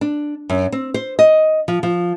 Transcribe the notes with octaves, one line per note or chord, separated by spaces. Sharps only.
D4
F#2
C4
C5
D#5
F3
F3